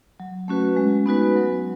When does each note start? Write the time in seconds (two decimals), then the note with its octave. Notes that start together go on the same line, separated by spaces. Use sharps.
0.20 F#3
0.48 A3 C#4 F#4 B4
0.77 G#3
1.06 B3 D#4 F#4 B4
1.35 F#3